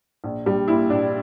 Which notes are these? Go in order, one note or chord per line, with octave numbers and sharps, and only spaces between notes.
A#1
A#1 G3
A#2 E4
A#1 D4